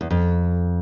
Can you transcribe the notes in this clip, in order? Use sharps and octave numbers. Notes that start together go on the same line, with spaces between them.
E2
F2